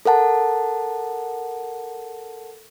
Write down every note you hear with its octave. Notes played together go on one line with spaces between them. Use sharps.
A4 A#4 F#5 A5